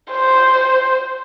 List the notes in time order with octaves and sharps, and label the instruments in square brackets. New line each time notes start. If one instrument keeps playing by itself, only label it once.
[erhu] C5